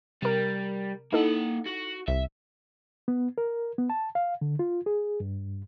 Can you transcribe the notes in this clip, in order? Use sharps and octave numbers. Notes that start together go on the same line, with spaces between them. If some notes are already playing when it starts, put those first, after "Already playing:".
C3 G3 A#4
A#3 D#4 E4 A4 F#5
F#4
C2 E5
B3
A#4
B3
A5
F5
D3
F4
G#4
G2